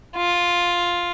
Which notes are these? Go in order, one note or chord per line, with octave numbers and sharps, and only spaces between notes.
F4